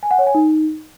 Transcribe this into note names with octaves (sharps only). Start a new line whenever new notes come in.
G#5
F#5
C#5
G#5
D#4